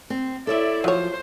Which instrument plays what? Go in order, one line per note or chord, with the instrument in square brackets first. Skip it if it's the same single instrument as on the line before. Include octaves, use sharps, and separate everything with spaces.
[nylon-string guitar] C4
[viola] E4 D5 [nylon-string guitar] A4 C#5 E5
[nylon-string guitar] F3 [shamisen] F#3 C#5 [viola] C5